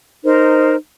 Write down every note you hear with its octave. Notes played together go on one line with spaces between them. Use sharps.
D#4 A#4 C5